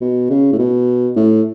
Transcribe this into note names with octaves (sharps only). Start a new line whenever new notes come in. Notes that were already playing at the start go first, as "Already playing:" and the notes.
B2
C#3
A2
B2
A2